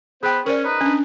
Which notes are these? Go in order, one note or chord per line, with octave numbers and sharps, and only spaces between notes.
B3 G#4 B4 C5 G5
C#4 A#4 C5 D5
D#4 B4
C#4 D4